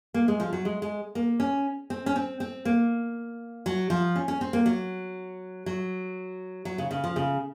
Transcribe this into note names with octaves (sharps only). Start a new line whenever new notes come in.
A#3
G#3
F3
F#3
G#3
G#3
A#3
C#4
C4
C#4
C4
C4
A#3
F#3
F3
C#4
C#4
C4
A#3
F#3
F#3
F#3
C#3
C#3
F3
C#3